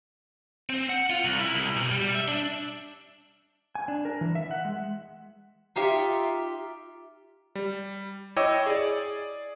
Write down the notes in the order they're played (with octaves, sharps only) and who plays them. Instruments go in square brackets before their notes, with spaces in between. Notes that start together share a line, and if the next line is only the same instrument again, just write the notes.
[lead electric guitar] C4
F#5
F4
C2
E4
C2
B2
G3
E5
D4
[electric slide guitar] G#5
D4
A#4
E3
E5
F#5
G#3
[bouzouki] D#4 F4 G4 E5
[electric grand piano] G3
E4 C#5 D#5 G5 D6 E6
G#4 D5